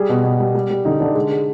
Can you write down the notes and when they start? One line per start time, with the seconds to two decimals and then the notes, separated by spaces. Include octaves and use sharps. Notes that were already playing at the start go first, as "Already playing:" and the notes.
Already playing: G3 G#4
0.09 B2
0.24 B2
0.40 G3
0.55 G3
0.70 G3
0.85 D3 D#4
1.00 D3 D4
1.15 G#3
1.31 G#3